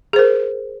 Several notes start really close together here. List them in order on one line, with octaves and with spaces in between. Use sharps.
G#4 C5 A#4